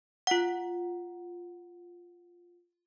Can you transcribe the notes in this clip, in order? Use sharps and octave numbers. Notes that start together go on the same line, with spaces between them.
F4 F#5